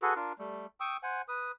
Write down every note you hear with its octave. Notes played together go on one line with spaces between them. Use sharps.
F#4 G#4 A4 B4
D4 F4 A#4
G3 A3
G5 C#6 D#6 E6
C5 F#5 G#5
B4 D#6